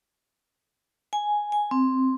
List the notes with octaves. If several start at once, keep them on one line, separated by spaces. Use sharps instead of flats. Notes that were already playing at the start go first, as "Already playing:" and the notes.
G#5
G#5
C4